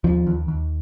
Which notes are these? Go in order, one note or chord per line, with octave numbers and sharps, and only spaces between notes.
D#2 F3
D#2
D#2